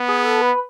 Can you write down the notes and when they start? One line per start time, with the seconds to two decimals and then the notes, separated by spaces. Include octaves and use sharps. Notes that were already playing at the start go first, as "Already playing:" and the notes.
Already playing: B3
0.08 G#4
0.25 A4
0.42 B4